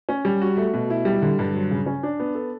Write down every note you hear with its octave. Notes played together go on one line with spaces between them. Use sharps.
C#4
G3
F#4
A3
B2
E4
G3
D3
G2
F#3
C#3
C#4
D4
B3
A4